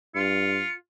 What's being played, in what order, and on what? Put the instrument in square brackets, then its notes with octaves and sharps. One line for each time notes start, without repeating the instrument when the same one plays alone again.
[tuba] G2 [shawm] F4 [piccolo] C#7